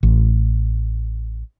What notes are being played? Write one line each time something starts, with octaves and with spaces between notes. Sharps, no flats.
A1